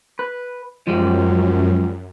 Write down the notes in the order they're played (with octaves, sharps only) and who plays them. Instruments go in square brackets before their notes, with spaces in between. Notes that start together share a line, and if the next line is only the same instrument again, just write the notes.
[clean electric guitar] B4
[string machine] F#2 [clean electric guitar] F3 G3 G#3